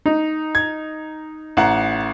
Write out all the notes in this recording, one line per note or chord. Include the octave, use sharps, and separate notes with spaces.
D#4
G#6
A1 F#5 A#5